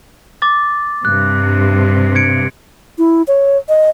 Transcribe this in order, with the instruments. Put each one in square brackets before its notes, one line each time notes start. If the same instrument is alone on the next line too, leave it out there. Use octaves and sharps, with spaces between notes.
[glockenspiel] D6 A6
[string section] G2 C3 [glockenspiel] F#6
[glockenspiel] G#6 C#7 D7
[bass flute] E4
C#5
D#5